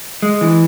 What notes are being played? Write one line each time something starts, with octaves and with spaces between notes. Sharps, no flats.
G#3
E3